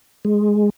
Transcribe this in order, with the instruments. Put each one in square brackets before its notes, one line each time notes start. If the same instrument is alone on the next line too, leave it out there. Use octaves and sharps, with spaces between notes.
[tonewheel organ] G#3